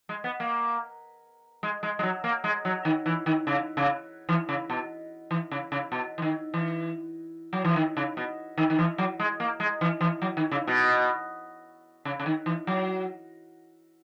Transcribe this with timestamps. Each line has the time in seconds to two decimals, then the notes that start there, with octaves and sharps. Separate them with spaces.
0.09 G#3
0.24 B3
0.40 A#3
1.63 G#3
1.83 G#3
1.99 G#3
2.03 F#3
2.24 A#3
2.44 G#3
2.65 F#3
2.85 D#3
3.06 E3
3.26 D#3
3.47 C#3
3.77 C#3
4.29 E3
4.49 C#3
4.70 B2
5.31 E3
5.51 C#3
5.72 C#3
5.92 B2
6.18 E3
6.22 D#3
6.54 E3
7.53 F#3
7.64 E3
7.76 D#3
7.97 C#3
8.17 B2
8.58 D#3
8.70 D#3
8.79 E3
8.98 F#3
9.20 G#3
9.40 A#3
9.60 G#3
9.81 E3
10.01 E3
10.22 F#3
10.37 D#3
10.52 C#3
10.67 B2
12.05 C#3
12.20 C#3
12.26 D#3
12.46 E3
12.67 F#3